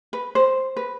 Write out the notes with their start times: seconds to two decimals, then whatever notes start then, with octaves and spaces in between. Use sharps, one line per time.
0.13 B4
0.35 C5
0.77 B4